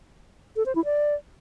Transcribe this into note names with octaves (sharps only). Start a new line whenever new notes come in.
A4
C5
E4
D5